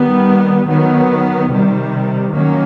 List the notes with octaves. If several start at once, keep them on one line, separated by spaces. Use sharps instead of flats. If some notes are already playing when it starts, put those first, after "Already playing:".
Already playing: D#3 G3 B3
D#3 F#3 B3
C3 D#3 G3
D#3 F#3 A#3 C#4